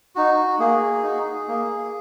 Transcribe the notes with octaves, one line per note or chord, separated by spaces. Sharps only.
D#4 F#4
A#3 G#4
D#4 F#4
A#3